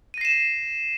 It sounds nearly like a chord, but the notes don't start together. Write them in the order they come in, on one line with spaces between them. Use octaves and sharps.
D#7 A#6 C7 E7